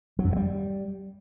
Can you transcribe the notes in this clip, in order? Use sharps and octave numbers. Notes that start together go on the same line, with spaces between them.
F#3
F#2
G2
G3